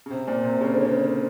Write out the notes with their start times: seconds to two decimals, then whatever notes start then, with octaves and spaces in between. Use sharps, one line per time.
0.06 C#3
0.11 C3 C5
0.27 A#2
0.44 C3
0.61 C#3
0.73 D3
0.85 C#3